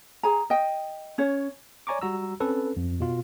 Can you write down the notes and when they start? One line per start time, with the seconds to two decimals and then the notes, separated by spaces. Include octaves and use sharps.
0.23 G#4 G#5 A#5
0.50 D#5 G5
1.18 C#4 C#5
1.87 C#5 D5 G#5 A#5 C#6 D6
2.02 G3 F#4 A#5 E6
2.40 C4 C#4 A4 B4
2.77 F2
3.00 B2 F4